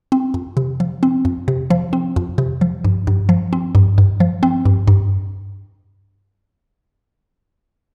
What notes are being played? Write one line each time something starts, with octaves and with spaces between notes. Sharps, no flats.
C4
F2
C3
F3
C4
F2
C3
F3
C4
F2
C3
F3
G2
G2
F3
C4
G2
G2
F3
C4
G2
G2